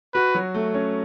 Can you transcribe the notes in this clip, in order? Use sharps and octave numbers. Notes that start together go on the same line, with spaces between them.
F#4 B4
F#3
A3
C#4